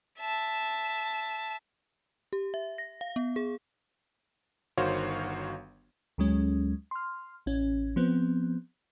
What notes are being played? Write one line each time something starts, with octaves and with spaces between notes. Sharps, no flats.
E5 A5
G4
E5
A#6
F5
B3
G#4
G1 D#3 F#4 C5 C#5 F5
D2 F#3 G#3 C#4
C6 F6
A1 C#4
F3 B3 C4